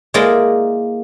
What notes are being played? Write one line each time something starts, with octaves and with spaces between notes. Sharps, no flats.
G#3 A#3 E4 A#4 D5 D#5